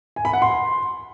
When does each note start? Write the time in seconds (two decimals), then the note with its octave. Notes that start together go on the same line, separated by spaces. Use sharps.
0.16 G#5
0.25 B5
0.33 F#5
0.42 C6